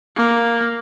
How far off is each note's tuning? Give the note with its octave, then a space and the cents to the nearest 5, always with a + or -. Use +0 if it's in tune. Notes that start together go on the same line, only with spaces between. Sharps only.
A#3 +0